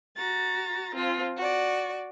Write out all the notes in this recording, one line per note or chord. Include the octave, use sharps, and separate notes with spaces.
F#4 A#5 A6
F3 C4 F4
F#4 D5